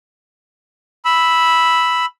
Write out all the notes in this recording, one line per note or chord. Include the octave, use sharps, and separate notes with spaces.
B5 E6